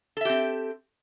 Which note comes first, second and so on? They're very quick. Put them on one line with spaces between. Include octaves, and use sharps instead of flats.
A4 E5 G4 C4